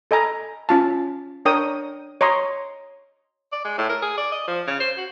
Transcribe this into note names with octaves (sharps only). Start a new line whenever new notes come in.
A4 D#5 G#5 A#5 B5
C#4 F4 A5
D4 A#4 C#5 G5 D#6
C#5 D#5 A#5 C6 D#6
D5
G#3
A2
A#4
G#4
D5
D#5
F3
C#3
C5
F#4